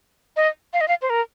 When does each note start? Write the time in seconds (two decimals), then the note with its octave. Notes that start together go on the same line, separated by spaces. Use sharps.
0.36 D#5
0.73 F5
0.81 D#5
0.88 F5
1.02 C5
1.10 A#4